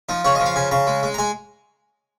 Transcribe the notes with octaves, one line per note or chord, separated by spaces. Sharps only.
F3 D#4
C#3 C#5
D#5
F3
F5
C#3 G#5
C#3 A#5
G#3
G#3
A#5
G#3 G#5